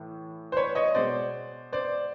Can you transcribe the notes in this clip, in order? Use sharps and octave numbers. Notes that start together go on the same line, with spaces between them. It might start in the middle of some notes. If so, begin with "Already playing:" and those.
Already playing: A2 E3
C5
B4 C#5
C#5 D#5
B2 G#3 C5 D5
C5 D5